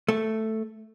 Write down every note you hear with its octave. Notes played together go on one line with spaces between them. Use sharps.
A3